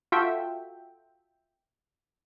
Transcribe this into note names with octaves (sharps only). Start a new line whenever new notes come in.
F4 F#4 A4 E5 G5